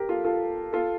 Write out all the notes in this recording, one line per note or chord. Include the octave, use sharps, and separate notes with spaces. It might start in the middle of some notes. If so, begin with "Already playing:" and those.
Already playing: G4 A#4
F4 A4
F4 A4
F4 A4